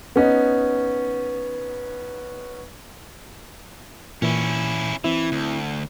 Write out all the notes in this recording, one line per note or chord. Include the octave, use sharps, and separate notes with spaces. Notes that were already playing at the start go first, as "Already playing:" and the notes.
B3 C#4 D#4
A#2 E3 C#4 E4
E3 C4 E4
D2